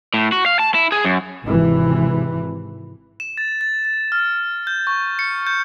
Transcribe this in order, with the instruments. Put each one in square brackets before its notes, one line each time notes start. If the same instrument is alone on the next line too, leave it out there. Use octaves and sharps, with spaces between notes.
[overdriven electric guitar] A2
F#4
F5
A5
E4
G#4
F#2
[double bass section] G#1 C3 E3
[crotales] E7
A6
A6
A6
F6
G6
C#6
C#7
G6